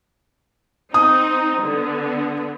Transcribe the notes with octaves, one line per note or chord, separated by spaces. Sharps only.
C4 D#4 D#6
D3 B3